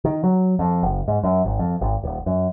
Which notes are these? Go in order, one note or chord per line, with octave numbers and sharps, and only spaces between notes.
D#3
F#3
F2
F#1
G#2
F#2
G#1
F2
G#1
D#1
F#2